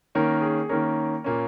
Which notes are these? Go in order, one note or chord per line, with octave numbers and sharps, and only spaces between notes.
D#3 A#3 C#4 A#4
G#4
D#3 A#3 C#4 A#4
A#2 A#3 C#4